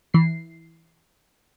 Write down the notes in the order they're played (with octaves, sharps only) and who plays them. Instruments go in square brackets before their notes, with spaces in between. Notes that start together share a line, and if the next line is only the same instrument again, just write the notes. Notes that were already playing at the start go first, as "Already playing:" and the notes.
[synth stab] E3 C7